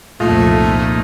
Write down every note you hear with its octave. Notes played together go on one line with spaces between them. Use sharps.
C2 F2 A#2 A3 D#4 F4